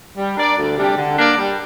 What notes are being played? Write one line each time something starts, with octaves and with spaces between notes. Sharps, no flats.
G3
D4 A#4 D5
D2
C3 G3 D4 G4
D3
A#3 D4 A#4 D5
G3